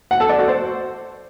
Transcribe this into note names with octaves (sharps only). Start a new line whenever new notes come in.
F#5
A4
D5
F#4
C5